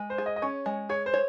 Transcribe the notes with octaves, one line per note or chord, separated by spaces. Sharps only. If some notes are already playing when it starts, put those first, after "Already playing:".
Already playing: G#3
C5
G#4
D#5
D#5
C#4 C#5
G#3
G#4 C#5
C5
C#5